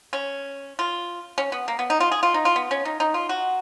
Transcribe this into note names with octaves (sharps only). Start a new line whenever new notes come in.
C#4
F4
C#4
B3
A#3
B3
D#4
F4
G#4
F4
D#4
F4
B3
C#4
D#4
D#4
F4
F#4